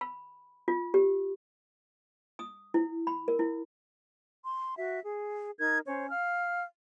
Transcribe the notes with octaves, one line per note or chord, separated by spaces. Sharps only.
B5
F4
G4
D#6
E4
B5
A#4
E4
C6
F#4 E5
G#4
D#4 A#4 G#6
C#4 C5 C#5
F5 F6